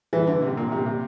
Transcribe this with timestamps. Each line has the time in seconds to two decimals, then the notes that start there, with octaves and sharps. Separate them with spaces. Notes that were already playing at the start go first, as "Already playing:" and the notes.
0.13 E3
0.27 D3
0.42 C3
0.57 A#2
0.72 C3
0.86 C3